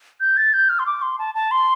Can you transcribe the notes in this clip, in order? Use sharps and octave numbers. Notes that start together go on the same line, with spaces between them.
G6
A6
G6
F6
C6
D6
C6
A5
A5
C6